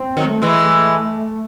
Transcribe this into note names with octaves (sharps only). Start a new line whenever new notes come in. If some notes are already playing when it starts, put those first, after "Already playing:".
Already playing: C4
D#3 F#3
A3
E3 G#3
A3